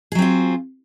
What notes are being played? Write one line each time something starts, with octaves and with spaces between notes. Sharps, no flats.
F#3 C4 F4 G#4